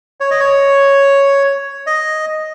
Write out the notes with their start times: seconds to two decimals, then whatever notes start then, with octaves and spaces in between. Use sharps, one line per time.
0.20 C#5
0.31 D#5
0.40 C#5
1.87 D#5